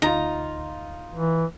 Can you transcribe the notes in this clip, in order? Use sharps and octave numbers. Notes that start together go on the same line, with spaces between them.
D2 D#4 F4 A#5
E3